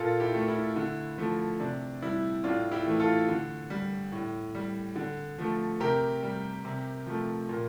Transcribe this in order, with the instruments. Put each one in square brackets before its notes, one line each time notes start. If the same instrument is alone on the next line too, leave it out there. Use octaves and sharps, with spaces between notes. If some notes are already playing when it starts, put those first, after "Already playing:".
Already playing: [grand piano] A#2 F4 A4
E4 G4
A3
E4
D3
F3 A3
C3 D4
G3 E4
A2 D4 F4
E4 G4
E3 A3
F4 A4
D3
G3
A2
G3
D3
F3 A3
C3 G4 A#4
G3
C3
F3 A3
A#2